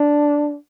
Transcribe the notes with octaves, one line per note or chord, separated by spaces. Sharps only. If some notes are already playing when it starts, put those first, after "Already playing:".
Already playing: D4